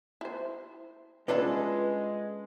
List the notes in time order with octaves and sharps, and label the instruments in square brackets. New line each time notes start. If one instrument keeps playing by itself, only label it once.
[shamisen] E4 C5
[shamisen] G3 D4 E4 [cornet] G#3 [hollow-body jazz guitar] C#4 F4 A4 [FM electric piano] B4